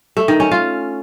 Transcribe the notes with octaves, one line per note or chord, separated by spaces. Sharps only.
A3
D#3
C#4
F4